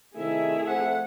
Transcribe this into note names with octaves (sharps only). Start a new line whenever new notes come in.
C3 D#3 A3 E4 G#4 E5
F2 C5 F#5